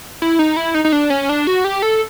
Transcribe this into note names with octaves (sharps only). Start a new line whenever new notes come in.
E4
D#4
E4
D#4
D#4
D4
C#4
D4
F#4
G4
A4